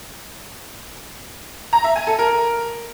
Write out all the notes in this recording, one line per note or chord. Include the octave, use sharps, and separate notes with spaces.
A#5
E5
G#5
A4
A#4